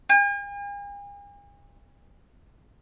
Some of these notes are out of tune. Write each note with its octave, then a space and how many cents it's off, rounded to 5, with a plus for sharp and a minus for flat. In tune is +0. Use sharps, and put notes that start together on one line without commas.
G#5 -45